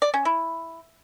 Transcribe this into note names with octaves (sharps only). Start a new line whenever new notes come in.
D5
C#4
E4